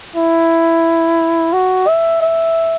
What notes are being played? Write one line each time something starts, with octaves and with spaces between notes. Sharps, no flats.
E4
F#4
E5
E5